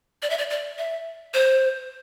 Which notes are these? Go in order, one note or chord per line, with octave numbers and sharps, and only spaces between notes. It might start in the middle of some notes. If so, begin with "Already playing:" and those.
D5
E5
D5
D5
E5
C5